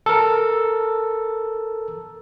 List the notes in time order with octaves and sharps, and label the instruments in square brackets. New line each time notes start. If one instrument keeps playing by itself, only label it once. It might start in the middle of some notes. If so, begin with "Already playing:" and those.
[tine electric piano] A4 A#4